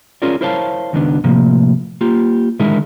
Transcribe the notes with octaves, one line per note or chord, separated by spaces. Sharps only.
C#4 F4 G#4 A#4 C#5 D5
E4 A#4 C5 C#5 F5 A5
C#2 D#3 B3 D4
A2 C3 F3 A#3
A#3 F4 G4
D3 D#3 G#3 E4 G#4 A#4